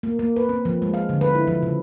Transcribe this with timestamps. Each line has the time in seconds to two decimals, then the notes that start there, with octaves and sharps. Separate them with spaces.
0.03 A#3
0.19 A#3
0.36 B4
0.49 C4
0.65 F3
0.82 G#3
0.94 F5
1.09 D3
1.21 B4
1.35 E4
1.47 F3
1.63 C#3